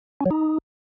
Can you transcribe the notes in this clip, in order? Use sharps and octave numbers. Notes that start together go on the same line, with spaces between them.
C#4
F#3
D#4